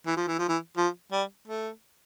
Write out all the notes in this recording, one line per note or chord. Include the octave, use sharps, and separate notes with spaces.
E3
F3
E3
F3
E3
F3
G3
A3